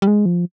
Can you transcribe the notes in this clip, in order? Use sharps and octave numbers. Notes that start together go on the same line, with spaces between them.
G3
G#3
F3